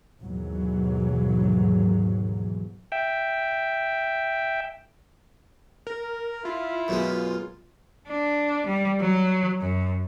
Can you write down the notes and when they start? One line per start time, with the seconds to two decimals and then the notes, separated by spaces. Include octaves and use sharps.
0.22 D#2 G#2 B2 E3 F#3
2.92 E5 G5
5.87 A#4
6.45 E4 F4
6.88 F#2 B2 G#3
8.08 D4
8.66 G3
9.01 F#3
9.61 F#2